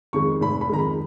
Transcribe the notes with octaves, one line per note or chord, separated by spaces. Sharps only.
F2 D#3 G#3 C#6
F1 B5
B5
F2 D#3 G#3 A#5
B5